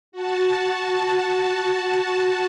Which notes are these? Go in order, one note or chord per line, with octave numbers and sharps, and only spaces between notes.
F#4 A5